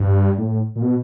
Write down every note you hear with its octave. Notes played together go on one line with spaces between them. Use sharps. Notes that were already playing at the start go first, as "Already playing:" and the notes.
Already playing: G2
A2
A#2
B2